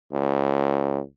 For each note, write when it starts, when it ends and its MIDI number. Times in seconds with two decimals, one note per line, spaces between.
0.12 1.00 37